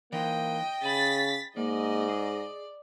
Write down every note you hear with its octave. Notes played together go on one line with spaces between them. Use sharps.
E3 A#3 D#4 C5 D#5 G5
C#3 G#5 B5 A6 B6
G#2 A#3 D5 D#5
G#4